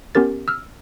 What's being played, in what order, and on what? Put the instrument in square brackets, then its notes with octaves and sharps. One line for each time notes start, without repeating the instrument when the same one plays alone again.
[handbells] B3 C#4 G4 A#4 A6
E6 F6